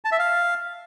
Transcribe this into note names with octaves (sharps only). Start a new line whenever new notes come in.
A5
E5
F5